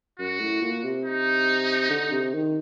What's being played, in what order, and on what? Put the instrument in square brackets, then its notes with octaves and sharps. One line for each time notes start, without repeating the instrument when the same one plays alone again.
[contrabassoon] F#2 [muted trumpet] F#4
[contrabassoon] A2
A#2
C3
[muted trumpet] D#4
[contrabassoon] D3
C3
D#3